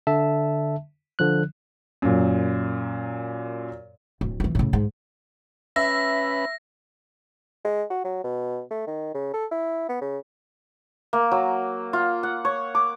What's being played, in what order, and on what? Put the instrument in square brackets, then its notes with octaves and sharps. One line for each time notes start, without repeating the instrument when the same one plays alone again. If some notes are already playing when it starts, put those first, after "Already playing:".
[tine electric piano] D3 E5 A5
D3 F3 F#6
[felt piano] F#2 A#2
[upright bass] D1
F2 E3
A2 C#3
G#2
[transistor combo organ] C#4 B4 B5 [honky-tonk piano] E5 [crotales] A#6
[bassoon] G#3
F#4
F#3
B2
A3
D#3
C#3
A4
E4
B3
C#3
[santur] A#3
F#3
F4
F#5
C#5
D6